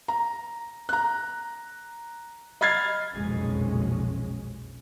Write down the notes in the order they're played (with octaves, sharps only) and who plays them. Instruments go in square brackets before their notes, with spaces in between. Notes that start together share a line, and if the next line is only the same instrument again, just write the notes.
[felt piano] A#5
A#5 F#6
D#5 B5 F6 G#6 A6 C7
[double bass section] F#1 B1 F2 A#2 G#3 C#4